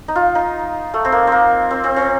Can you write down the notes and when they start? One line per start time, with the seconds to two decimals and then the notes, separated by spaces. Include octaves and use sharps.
0.08 D#4
0.16 F4
0.35 D#4
0.94 A3
1.05 C4
1.12 A#3
1.27 A#3 C4
1.71 C4
1.84 C4
1.96 C4